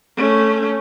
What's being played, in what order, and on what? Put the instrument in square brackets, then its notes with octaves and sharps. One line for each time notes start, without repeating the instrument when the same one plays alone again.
[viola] A3 C#4